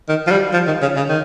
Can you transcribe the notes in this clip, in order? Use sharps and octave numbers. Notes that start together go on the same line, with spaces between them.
D#3
F3
G3
F3
D#3
C#3
C#3
D#3